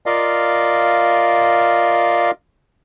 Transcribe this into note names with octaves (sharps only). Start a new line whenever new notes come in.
F4 A#4 D5 D#5 F5